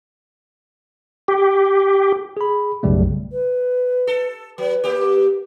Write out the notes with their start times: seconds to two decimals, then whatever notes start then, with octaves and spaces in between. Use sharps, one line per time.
1.28 G4
2.37 G#4 B5
2.83 B1 F#2 C#3 G3 A3
3.32 B4
4.07 A4
4.58 F#3 B4
4.84 A#3 G4